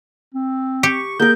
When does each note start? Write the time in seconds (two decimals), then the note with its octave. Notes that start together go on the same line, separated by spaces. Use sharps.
0.34 C4
0.83 G4 C#6
1.20 A#3 G#4 A#4 G6